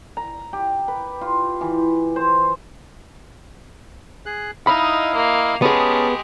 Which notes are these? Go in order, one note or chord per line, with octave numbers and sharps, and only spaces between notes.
A#5
G4
B4
F4
E3
C5
G#4 F#6
D#4 E4 D#5 F5 B5
A#3
G#3 B3 C#4 G4 G#4 A5